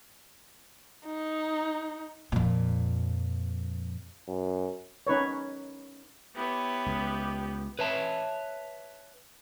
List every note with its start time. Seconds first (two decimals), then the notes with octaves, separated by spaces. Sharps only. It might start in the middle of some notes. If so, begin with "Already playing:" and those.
1.06 D#4
2.32 F2 A#2
4.28 F#2
5.07 C#4 D#4 B4 C#5
6.35 B3 E4 G4 C#5
6.86 C#2
7.79 B4 C#5 E5 A5